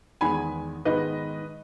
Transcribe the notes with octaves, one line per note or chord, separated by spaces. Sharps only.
E2 D#3 G#3 B3 G#5 B5
G#2 D#3 G#3 B3 B4 D#5